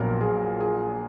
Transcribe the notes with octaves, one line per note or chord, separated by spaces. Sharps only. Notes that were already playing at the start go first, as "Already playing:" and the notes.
Already playing: A#1 A#2 F#3 B3 A#4
G#4
G#4